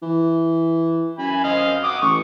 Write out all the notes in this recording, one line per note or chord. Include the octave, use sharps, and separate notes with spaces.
E3
F#2 G#5 B5
C4 D#5 F5
F#5 D6 D#6
A1 C#6